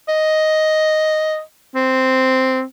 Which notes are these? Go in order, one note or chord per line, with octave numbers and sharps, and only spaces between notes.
D#5
C4